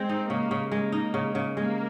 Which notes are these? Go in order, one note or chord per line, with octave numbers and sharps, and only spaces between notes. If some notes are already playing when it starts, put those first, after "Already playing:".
Already playing: G#3 C4
D#4
C#3 A#3
C#3
G#3 A#3
D#4
C#3
C#3
G#3 A#3